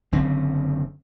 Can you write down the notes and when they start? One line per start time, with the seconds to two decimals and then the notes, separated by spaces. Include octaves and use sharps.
0.12 F#1 D3 C4 C#4